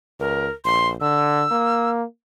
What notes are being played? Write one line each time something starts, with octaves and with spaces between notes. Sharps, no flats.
C#2 A#4
A#1 C6
D3 E6
A#3